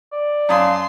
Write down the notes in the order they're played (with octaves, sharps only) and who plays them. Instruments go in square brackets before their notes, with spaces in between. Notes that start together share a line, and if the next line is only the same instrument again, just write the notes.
[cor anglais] D5
[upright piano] F#2 A5 D#6 [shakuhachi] F5 [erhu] C6